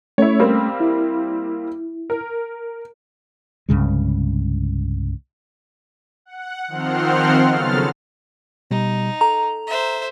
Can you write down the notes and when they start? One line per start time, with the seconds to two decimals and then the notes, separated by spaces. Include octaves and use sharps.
0.18 A3 C#4 E4 C#5
0.39 G3 A#3 C4
0.80 E4
2.10 A#4
3.69 C2 G2 C#3 G#3
6.25 F#5
6.68 D#3 F3 C4 F#5 C6 F6
7.50 C#3 F#3 B3 A4 F6 A6
8.71 B2 G3 D#4
9.21 A4 A#5
9.67 C5 E5